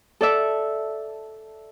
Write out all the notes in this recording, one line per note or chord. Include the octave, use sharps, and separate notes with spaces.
A4 D5 E5